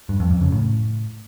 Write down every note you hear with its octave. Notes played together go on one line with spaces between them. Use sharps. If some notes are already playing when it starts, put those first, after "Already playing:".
G2
F2
F2
C#3
A2